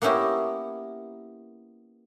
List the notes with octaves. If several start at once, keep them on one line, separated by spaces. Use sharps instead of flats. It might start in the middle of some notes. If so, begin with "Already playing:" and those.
A#3 B3 C#4 E4 G4 A#4